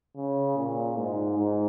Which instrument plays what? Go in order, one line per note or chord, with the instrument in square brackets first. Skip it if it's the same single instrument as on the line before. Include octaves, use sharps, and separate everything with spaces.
[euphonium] C#3
A#2
G#2
G#2